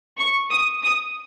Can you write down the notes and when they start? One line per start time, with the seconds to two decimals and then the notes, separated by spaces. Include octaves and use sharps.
0.19 C#6
0.51 D#6
0.82 D#6